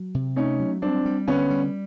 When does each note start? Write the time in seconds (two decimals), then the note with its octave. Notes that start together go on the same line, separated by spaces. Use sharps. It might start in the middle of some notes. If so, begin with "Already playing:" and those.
Already playing: F#3
0.15 C3
0.36 A3 C#4 D#4
0.60 F#3
0.82 G3 C4 D4
1.05 G3
1.28 D3 B3 C#4
1.50 G3